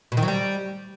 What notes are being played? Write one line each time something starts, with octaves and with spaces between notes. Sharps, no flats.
B2
D#3
F#3
G3